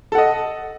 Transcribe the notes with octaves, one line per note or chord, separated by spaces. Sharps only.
A4 D#5 F#5